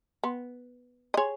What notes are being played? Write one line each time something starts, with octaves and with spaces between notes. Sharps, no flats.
B3
D#5
G#4 C#5